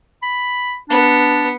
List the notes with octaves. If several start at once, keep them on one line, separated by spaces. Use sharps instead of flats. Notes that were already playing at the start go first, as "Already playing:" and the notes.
B5
B3 D4